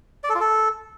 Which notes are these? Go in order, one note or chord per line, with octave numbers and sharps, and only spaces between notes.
D5
A4
F4
A4